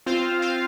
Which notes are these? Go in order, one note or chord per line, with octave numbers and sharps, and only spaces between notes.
C4 F4 C5 F5
C4 F4 C5 F5